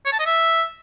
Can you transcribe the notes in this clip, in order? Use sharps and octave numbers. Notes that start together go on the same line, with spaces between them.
C#5
A5
D#5
E5